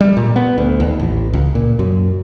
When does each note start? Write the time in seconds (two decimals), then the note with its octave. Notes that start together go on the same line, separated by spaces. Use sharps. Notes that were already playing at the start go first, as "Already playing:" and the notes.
0.01 G3
0.17 A#2
0.36 B3
0.58 D2
0.80 D#2
1.00 A1
1.33 C#2
1.55 A#2
1.79 F#2